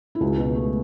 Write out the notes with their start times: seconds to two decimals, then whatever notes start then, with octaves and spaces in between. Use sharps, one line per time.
0.15 E4
0.20 C#2 F#4
0.38 B2
0.55 A3